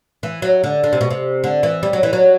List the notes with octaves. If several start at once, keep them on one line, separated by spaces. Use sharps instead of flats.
E3
F#3
D3
D3
C3
B2
C3
D3
E3
G3
F#3
E3
F#3